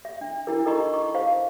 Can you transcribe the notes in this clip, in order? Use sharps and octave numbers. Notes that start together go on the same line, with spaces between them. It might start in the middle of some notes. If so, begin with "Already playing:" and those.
E5
D4
D4 E4 A#4
D#4 A4 A#4 D#5 A#5 C#6
C#6
C5 F5